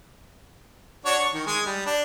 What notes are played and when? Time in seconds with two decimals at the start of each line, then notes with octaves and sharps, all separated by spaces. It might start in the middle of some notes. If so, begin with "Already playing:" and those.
1.06 D4 F#4 C#5
1.20 C#6
1.34 D#3
1.46 G#3 G#5
1.66 G3
1.86 D4